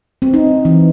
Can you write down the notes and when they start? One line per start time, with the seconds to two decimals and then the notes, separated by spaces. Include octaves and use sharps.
0.22 C4
0.34 D#4
0.65 E3